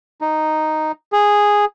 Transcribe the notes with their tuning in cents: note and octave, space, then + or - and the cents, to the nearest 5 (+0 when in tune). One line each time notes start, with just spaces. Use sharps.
D#4 -5
G#4 -10